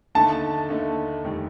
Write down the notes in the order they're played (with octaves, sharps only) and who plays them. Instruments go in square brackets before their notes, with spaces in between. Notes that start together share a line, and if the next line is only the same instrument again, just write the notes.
[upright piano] D#2 D3 A3 D#4 [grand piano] A5
[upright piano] D#2 D3 A3 D#4
F1 D#3 G3